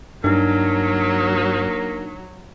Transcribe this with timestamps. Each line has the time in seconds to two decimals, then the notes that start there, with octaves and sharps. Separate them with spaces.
0.24 G2 F#3 A#3 D4 D#4